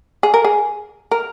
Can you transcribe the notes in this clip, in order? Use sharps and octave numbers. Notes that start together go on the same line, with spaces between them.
G#4
A#4
G#4
A#4